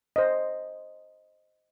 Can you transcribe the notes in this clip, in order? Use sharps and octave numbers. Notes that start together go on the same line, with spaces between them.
C5 D#5